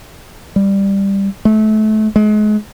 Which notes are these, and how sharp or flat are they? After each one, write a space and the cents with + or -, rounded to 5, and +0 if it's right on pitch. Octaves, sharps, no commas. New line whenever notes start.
G3 +10
A3 -30
G#3 +35